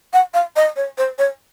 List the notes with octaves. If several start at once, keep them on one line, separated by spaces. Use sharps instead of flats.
F#5
F5
D#5
C#5
C5
C#5